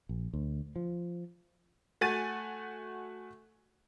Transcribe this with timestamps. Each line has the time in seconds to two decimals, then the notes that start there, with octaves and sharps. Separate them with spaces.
0.09 A#1
0.33 D2
0.76 F3
2.01 A3 F#4 F#5 G#5 A6 D#7